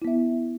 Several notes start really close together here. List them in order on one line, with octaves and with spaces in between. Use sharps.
E4 B3 E5